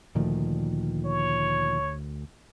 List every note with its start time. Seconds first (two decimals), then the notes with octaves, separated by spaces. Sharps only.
0.15 D2 A#2 D#3 F3
1.05 C#5